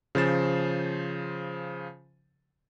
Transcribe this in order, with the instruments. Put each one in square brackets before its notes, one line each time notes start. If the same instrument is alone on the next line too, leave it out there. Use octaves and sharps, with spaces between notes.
[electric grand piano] C#3 F3 C5 A6 E7